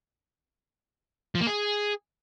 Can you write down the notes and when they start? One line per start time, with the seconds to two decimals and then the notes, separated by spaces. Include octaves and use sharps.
1.35 F3
1.41 A#3
1.47 G#4